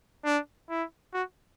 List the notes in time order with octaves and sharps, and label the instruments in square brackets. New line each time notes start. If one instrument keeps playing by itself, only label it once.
[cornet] D4
E4
F#4